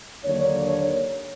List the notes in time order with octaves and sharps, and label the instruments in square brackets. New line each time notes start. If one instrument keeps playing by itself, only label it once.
[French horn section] D#2 D3 F#3 A#3 D4 C#5